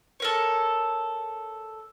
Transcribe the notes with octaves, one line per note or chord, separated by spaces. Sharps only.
A4 A#4 C#5